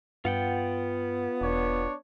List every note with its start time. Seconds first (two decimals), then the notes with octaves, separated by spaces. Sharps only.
0.25 G2 B3 F4 F#5 G5
1.41 E1 D4 C#5